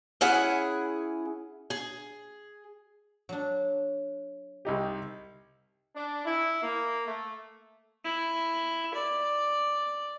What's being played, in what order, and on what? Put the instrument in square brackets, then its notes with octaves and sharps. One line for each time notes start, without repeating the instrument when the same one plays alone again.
[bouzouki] C#4 E4 G#4 F#5
G#4
[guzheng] F#3 D4
[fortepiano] C2 D#4 G4
[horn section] D4
E4
A#3
A3
[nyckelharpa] E4
D5